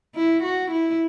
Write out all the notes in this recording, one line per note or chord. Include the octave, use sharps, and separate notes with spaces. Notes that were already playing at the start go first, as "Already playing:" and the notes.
E4
F#4
E4